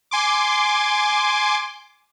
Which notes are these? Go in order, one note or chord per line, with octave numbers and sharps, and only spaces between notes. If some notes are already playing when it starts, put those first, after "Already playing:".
G#5 C6 D6